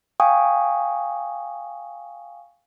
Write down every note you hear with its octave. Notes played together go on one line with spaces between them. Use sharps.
F5 G5 G#5 C#6 D#6